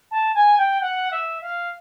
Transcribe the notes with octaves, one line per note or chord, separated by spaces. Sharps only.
A5
G#5
G5
F#5
E5
F5